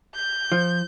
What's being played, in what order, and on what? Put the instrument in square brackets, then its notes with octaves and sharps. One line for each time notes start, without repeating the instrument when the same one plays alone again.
[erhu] G6
[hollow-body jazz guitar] F3